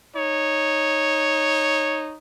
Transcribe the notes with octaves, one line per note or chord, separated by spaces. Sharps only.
D#4 C#5